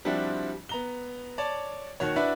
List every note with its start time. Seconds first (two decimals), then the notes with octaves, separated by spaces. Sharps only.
0.05 F3 G3 C4 D4 E4 F#4
0.69 B3 A#5 G7
1.38 C#5 D5 A5
2.00 D#2 D#3 F#4 C#5
2.16 D4 E4 F#4 B4 D5 E5